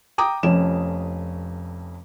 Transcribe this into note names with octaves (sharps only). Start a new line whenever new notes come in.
G5 A#5 D6 D#6
F1 F2 C#4 E7